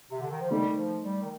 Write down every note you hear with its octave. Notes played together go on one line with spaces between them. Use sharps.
C3
D3
D#3
F3
D#3 G3 A3 D#4
F3
G3
D#3